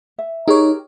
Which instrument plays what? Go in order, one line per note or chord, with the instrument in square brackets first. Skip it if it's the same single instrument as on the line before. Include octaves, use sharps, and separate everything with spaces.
[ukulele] E5
[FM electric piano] D#4 C#5 [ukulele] G4 G#4 A#4